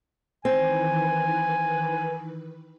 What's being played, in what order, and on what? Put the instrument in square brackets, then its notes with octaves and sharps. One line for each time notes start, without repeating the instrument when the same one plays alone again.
[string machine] D#3 E3 B4 [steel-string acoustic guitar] C4 [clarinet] G#5